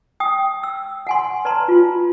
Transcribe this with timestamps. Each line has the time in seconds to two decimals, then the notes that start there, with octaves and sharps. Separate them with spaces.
0.20 G5 D#6
0.64 E6
1.07 F#5 G#5 C6
1.45 B4 D5 A5 A#5 C6
1.68 F4